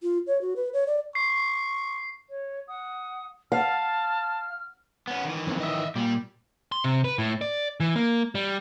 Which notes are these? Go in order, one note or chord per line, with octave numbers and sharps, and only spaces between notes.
F4
C#5
F#4
B4
C#5
D5
C#6 C7
C#5
F#5 D#6
F5 A5 F6
B3 C#4
D#3 E3
B1 F2
D#5 E5
A#2 G3
C6
C3
B4
A2
D5
E3
A#3
G3